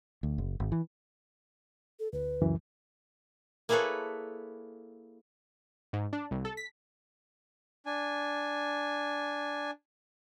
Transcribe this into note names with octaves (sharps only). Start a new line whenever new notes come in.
D2
F#1
G#1
E3
A4
D2 B4
C#2 F#2 E3
A#3 E4 G#4 A4 B4 C#5
G#2
D4
C2
A4
B6
D4 G#5